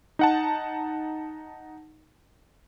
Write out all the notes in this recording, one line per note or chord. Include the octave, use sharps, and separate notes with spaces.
D#4 F#5 A5